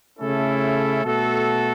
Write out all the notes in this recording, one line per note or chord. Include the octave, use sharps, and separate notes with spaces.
C#3 A3 C#4 E4 A4
B2 A3 F#4 A4